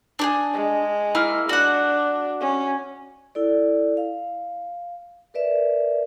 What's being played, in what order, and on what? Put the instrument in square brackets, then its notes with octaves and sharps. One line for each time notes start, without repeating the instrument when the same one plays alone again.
[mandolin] D4 G4 G#4
[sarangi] G#3
[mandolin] A#3 E4 F6
[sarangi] D4 [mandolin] F#4 F#5
[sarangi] C#4
[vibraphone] E4 A4 D5
F5
A#4 B4 D5 E5